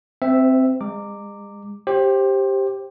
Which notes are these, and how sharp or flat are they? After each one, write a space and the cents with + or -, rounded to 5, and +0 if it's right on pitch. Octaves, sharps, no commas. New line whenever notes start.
C4 +0 C5 -35 E5 +0
G#3 -40 A#5 -20 D6 +0
G4 +0 C5 +20